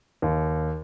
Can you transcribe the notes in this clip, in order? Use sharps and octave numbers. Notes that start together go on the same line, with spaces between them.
D#2